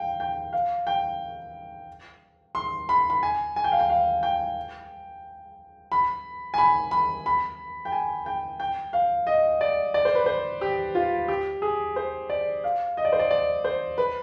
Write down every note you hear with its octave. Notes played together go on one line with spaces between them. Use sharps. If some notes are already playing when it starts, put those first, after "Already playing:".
Already playing: F5 G5
G5
F5
G5
C6
B5
B5
G#5
G#5
G5
F5
G5
F5
G5
B5
G#5
B5
B5
B5
G5
G#5
G5
G5
F5
D#5
D5
D5
C5
B4
C5
G4
F4
G4
G#4
C5
D5
F5
D#5
D5
C5
D5
D5
C5
B4